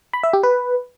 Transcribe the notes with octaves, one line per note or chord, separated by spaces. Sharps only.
B5
E5
G4
B4